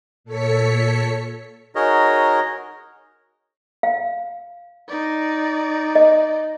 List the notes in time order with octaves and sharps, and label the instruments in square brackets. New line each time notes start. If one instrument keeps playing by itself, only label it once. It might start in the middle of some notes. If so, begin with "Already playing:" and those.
[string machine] A#2 A4 C#5 B6 C#7
[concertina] D#4 F#4 G#4 A#4 C#5 D#5
[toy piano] F5
[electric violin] D#4 D5
[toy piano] D#5